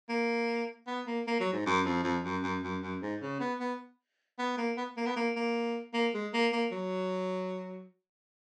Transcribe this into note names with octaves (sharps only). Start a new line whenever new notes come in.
A#3
B3
A#3
A#3
F#3
G#2
F#2
F2
F2
F#2
F#2
F#2
F#2
G#2
C#3
B3
B3
B3
A#3
B3
A#3
B3
A#3
A#3
A#3
G#3
A#3
A#3
F#3